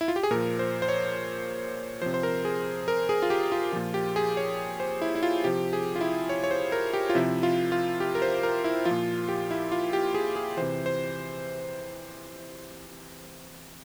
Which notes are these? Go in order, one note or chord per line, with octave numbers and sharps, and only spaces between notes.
E4
F4
G4
G#4
A#2 F3 A#4
C5
C5
C#5
C3 F3 C5
C5
A#4
G#4
A#4
G#4
F4
G4
F4
A#2 F3 F4
G4
G#4
C#5
C5
E4
E4
F4
C3 F3 G4
G#4
F4
E4
C#5
C#5
C5
A#4
G4
F4
C3 F3 E4
F4
F4
G4
A#4
C5
A#4
E4
F3 F4
A#2
G4
E4
F4
G4
G#4
G#4
C3 E3 C5
C5